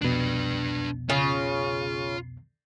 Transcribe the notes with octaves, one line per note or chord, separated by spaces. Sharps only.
C2 F2 B2 D4 B4
C#3 F4